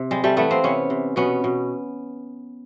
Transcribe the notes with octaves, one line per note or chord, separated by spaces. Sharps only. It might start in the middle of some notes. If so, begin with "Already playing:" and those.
Already playing: C3
G3 G#3
G3 A3
E3 A3 B3
A#3 C4
C3 B3 C#4
C3
B2 B3 C#4
B2